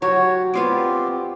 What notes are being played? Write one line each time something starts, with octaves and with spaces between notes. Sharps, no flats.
F#3 F#4 G4 C#5
B3 C4 F4 G4 D5